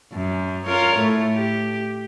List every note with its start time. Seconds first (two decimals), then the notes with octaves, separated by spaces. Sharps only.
0.13 F#2
0.65 F4 A#4 C#5
0.96 A2 A3
1.34 G4